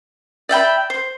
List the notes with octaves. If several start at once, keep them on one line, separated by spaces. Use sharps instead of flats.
D5 E5 G5 B5
C5